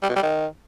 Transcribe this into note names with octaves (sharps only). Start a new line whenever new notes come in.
G3
B2
G3
D#3